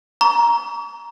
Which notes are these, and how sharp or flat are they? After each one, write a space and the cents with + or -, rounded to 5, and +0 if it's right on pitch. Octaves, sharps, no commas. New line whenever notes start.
A#5 +10 C#6 +40